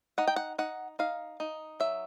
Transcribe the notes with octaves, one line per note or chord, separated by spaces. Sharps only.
D#4 F#5
G5
F#5
D#4 F#5
D#4 F5
D#4
F#3 E5